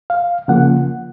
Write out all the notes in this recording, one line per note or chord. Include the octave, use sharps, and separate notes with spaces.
F5
C#3 F3 A#3 F#5